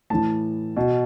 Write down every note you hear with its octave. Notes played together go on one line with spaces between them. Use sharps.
A2 E3 A5
B2